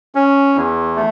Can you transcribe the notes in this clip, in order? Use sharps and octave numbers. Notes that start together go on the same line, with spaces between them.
C#4
E2
A3